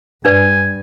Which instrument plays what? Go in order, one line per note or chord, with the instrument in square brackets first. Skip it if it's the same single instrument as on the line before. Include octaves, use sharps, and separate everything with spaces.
[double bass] G2 [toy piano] D4 B4 D5 [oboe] G#5